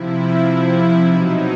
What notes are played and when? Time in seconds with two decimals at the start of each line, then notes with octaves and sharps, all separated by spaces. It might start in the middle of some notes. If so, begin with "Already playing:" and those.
Already playing: C3 F3 E4
1.05 B2 F#3 D#4